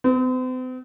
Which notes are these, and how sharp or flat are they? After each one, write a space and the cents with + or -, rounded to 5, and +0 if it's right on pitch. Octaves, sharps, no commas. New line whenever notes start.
C4 -45